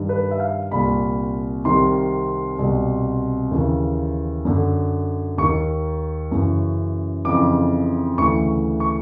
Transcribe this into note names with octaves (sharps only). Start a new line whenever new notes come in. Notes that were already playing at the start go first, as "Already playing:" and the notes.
Already playing: G2 D#3
B4
E5
F5
C2 A#2 B5
C2 C3 D#3 C6
C2 B2
D#2 C#3 E3
F#2 D3
D#2 D#3 C#6
F#2 C#3 E3
F2 C#3 E3 D6
D2 C#3 E3 C#6
C#6